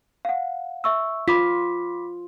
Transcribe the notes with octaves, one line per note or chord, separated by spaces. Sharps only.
F5 F#5
E5 C#6 E6
F4 B5 D6 B6